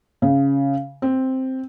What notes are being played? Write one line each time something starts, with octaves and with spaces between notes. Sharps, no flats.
C#3
C4